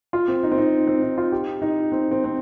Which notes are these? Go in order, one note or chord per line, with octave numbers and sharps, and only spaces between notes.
F4
C4
D#4
C4
D#4
C4
D#4
F4
G4
D#4
C4
C4
C4